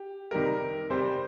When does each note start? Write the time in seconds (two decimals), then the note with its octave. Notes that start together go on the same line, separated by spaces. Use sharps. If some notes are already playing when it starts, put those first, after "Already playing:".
Already playing: G4
0.31 C3 D#3 G3 A#4
0.90 C3 G3 C5